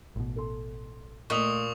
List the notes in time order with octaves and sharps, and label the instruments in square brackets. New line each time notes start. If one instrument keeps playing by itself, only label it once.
[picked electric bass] A1 B2
[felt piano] A4 C6
[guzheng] A#2 [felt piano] A3 D#5 [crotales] C#6 D#6 F7